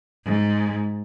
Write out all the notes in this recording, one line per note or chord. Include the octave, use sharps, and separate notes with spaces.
G#2